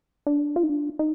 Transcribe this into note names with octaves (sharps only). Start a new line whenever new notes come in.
D4
F4
D#4
D4
D#4